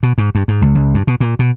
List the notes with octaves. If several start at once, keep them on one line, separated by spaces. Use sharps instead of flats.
B2
G#2
G2
G#2
C#2
C#2
G2
B2
A#2
B2